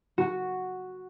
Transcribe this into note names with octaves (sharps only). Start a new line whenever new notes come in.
F#4